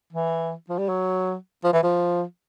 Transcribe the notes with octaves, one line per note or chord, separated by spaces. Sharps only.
E3
F3
G3
F#3
F3
E3
F3